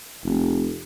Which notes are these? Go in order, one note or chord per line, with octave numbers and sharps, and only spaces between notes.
F1